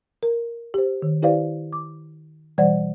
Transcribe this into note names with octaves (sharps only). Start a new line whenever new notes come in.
A#4
G4 C5
D#3
E4 G4 B4 C5 D5 F5
D6
B2 E3 G3 C5 D5 F#5